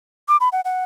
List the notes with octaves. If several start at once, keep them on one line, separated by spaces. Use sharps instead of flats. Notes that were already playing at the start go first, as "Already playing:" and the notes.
D6
B5
F#5
F#5